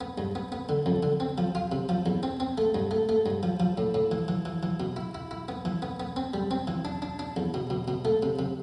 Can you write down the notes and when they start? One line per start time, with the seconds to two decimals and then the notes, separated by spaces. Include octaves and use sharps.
0.01 B3
0.18 G2
0.35 B3
0.52 B3
0.69 D3
0.86 F2
1.03 D3
1.20 C4
1.38 F3
1.55 F4
1.72 C3
1.89 F3
2.06 E2
2.23 C4
2.40 C4
2.58 A3
2.75 G2
2.91 A3
3.09 A3
3.26 G2
3.43 F3
3.60 F3
3.78 A2
3.94 A2
4.11 E3
4.28 E3
4.45 E3
4.63 E3
4.80 B2
4.96 E4
5.15 E4
5.31 E4
5.48 B3
5.65 E3
5.82 B3
6.00 B3
6.16 C4
6.34 G3
6.51 C4
6.67 E3
6.85 D4
7.02 D4
7.19 D4
7.37 E2
7.54 B2
7.70 B2
7.88 B2
8.05 A3
8.23 C3
8.39 C3